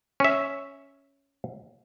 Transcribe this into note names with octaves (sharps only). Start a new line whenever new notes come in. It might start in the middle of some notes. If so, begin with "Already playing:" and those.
C#4 E5